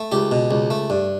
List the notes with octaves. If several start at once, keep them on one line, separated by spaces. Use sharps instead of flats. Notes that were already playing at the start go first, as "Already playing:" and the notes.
Already playing: A3
C#2 G4
B2
C#2
A3
G2